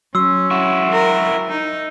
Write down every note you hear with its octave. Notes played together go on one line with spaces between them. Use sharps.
F#3 C#4 C6 E6
E4 F#4
A#4
D#4